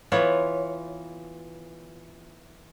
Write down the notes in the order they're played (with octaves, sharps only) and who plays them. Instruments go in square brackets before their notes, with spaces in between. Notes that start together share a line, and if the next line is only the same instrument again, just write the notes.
[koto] E3 B3 F4 C#5